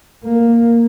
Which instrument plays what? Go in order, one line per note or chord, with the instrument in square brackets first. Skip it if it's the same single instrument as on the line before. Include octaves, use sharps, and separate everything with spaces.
[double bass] A#3